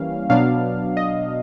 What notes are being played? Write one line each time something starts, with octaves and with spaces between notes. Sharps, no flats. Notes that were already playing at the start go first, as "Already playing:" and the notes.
Already playing: E3 G3 A#3 C#4 F5
B2 F#3 B3 D4 F5
D#5